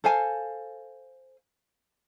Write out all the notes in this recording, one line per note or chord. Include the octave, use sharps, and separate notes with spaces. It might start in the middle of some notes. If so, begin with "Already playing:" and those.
A4 C5 F5 G#5